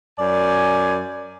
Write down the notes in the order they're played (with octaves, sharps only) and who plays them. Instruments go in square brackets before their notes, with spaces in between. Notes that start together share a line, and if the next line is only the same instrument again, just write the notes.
[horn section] F#2 D5 G#5